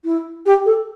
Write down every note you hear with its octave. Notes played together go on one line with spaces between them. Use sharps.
E4
G4
A4